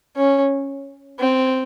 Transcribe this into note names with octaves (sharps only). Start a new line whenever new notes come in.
C#4
C4